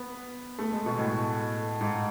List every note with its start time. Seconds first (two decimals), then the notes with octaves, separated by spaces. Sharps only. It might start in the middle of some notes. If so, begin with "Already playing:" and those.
Already playing: B3
0.59 A3
0.72 G#3
0.86 B2
0.99 A2
1.81 G#2